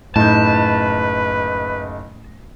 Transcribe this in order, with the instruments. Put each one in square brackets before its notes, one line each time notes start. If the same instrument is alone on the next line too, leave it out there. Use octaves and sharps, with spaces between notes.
[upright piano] F#1 D#4 G6 [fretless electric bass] A2 [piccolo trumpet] B4 [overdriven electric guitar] A5